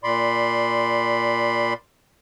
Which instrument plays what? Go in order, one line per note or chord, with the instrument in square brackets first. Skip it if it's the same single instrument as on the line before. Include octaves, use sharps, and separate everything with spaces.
[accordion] A#2 D5 B5 C6